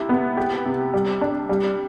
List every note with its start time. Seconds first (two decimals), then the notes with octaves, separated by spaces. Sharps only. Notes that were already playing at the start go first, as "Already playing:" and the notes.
Already playing: C3 E4
0.09 B3
0.37 G4
0.65 C3
0.94 G3
1.21 D4
1.49 G3